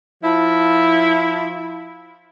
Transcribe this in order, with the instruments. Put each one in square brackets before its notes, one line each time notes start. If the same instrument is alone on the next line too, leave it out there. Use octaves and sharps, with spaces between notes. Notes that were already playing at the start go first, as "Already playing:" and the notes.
[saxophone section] F3 E4